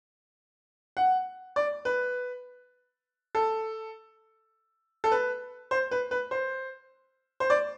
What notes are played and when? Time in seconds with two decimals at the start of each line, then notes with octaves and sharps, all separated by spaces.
0.97 F#5
1.56 D5
1.85 B4
3.35 A4
5.04 A4
5.12 B4
5.71 C5
5.91 B4
6.11 B4
6.31 C5
7.40 C5
7.50 D5